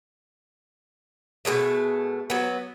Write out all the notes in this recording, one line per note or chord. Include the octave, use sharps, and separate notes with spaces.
B2 D#3 G#3 A3
F#3 B3